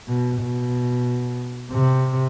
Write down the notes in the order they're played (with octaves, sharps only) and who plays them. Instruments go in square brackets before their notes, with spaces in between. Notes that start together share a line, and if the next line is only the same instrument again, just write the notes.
[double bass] B2
B2
C3